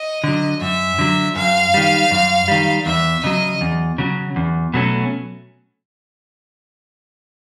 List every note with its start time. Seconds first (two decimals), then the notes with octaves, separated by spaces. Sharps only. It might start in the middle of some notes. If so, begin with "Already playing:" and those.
Already playing: D#5
0.24 D3 F#3
0.61 F#2 E5
0.99 D3 F#3
1.36 F#2 F5
1.74 D#3 G3
2.11 F#2
2.48 D#3 G3
2.86 E2 E5
3.24 C#3 F#3 D#5
3.61 E2
3.98 C#3 F#3
4.36 E2
4.74 B2 F#3 A3 C#4